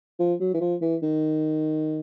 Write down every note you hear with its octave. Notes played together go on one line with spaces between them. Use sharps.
F3
F#3
E3
F3
E3
D#3